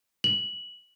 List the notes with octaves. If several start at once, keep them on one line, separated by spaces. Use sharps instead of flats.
F#7